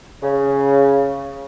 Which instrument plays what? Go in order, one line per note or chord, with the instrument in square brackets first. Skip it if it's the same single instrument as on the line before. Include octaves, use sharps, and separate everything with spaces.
[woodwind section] C#3